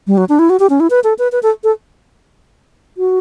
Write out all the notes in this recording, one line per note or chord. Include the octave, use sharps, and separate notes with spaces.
G3
F#3
D4
E4
F#4
G4
C#4
E4
B4
A4
B4
B4
A4
A4
F#4